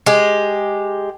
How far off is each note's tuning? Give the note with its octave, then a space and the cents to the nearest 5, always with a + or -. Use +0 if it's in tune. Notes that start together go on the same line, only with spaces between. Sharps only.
G#3 +0 G4 +5